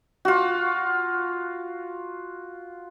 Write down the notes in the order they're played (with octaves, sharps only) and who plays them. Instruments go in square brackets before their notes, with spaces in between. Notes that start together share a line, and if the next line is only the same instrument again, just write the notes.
[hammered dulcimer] F4 F#4